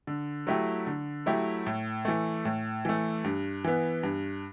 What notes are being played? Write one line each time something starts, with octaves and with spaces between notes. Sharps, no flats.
D3
F#3 A3 E4 G4
D3
F#3 A3 E4 G4
A2
E3 A3
A2
E3 A3
G2
E3 B3
G2